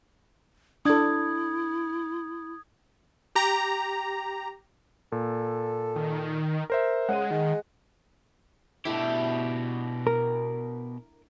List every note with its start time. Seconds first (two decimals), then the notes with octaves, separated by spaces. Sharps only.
0.85 D4 E4 A4 D#6 G#6
3.35 G4 A#5
5.12 A#2 A4
5.96 D#3
6.70 A#4 C5 E5
7.09 C#3 G#3 F#5 D#7
7.31 D#3 G#3
8.85 B2 A3 D4 E4 G4
10.07 A#4